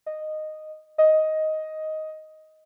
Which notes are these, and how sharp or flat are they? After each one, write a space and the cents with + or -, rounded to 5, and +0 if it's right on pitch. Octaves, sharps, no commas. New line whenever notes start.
D#5 -10
D#5 +10